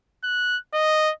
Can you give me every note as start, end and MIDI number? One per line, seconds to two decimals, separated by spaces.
0.24 0.58 90
0.74 1.12 75